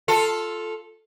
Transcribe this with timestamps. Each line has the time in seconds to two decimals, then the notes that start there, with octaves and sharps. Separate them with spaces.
0.08 F4 A4